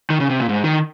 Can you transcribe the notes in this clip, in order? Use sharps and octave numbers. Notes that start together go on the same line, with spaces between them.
D#3
C#3
C3
A#2
G#2
D#3